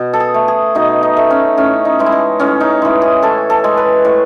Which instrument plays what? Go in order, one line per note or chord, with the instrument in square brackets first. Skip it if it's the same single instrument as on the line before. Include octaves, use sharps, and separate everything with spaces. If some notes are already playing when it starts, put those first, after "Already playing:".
Already playing: [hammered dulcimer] B2
A4
G#4
A3
G#4
B2 D#4
D#4
A3
C#4
A2 C#4
D#4
E3 G#3
E4
D#4
A2 C#4
D#4
E3 G#3
G#4
A2 A4
A4
G#3
B4
A2